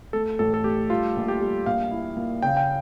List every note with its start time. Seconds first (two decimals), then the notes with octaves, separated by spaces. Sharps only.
0.13 A3 A4
0.39 A1 A4
0.54 A4
0.64 A3 G4
0.90 G3 F4
1.16 A#1
1.28 G4
1.40 G3
1.66 A#1 F5
1.91 E4
2.17 A#2
2.42 C#3 G5
2.57 G5